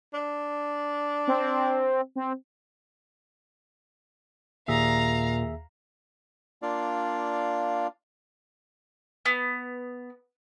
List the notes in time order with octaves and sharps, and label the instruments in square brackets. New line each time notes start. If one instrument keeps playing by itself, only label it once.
[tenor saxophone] D4
[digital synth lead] C4
C4
[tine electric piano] D#2 G#4 E5 [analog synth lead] A#2 [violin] F5 A#5
[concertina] A#3 D4 F4 D5 F5
[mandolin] B3